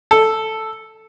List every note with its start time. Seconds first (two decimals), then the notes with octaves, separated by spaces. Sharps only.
0.11 A4